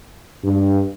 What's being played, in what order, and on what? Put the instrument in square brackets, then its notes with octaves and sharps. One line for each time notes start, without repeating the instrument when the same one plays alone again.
[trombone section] G2